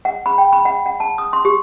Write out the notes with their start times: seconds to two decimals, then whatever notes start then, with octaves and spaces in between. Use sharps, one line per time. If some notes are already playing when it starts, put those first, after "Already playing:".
0.05 F#5
0.26 B5
0.38 G5
0.53 B5
0.65 F#5
0.86 F#5
1.00 A5
1.18 D#6
1.33 C6
1.45 G4